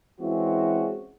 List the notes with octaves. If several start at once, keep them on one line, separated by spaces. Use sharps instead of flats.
E3 G#3 C4 C#4 E4 F#4